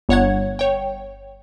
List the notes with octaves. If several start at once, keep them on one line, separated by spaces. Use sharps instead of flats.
G1 C#5 F#5 G#6
C#5 G5